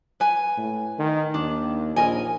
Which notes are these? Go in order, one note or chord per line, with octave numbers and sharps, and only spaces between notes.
B4 G#5
A2
D#3
D#2 D4
A#1 A#4 D#5 G#5